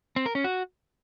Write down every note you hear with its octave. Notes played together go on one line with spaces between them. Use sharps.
C4
A#4
C#4
F#4